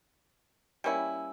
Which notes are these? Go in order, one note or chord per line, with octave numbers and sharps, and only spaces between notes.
G3 A#3 C#4 E4